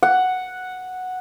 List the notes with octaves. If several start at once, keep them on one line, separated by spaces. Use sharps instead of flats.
F#5